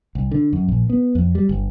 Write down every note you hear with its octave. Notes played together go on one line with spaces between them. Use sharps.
C2
D3
F#2
A#1
B3
F2
G3
G1